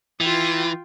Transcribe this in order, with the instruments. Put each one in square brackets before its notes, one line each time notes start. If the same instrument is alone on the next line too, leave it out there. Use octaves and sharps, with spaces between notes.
[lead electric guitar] E3 [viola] F4 G5